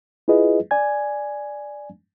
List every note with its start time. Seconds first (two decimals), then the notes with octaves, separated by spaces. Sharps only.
0.28 E4 F4 G#4 B4 D#5
0.71 D5 G#5 G#6